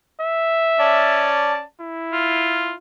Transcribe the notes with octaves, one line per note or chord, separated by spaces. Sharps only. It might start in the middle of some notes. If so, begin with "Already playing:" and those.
E5
C#4 D5 A5
E4
F4